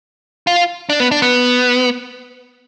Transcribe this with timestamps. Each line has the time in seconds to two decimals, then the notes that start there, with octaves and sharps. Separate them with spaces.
0.47 F4
0.90 D4
1.00 B3
1.11 D4
1.22 B3